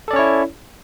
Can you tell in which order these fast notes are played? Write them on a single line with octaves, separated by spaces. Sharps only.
A4 D5 C#4 C#5 E4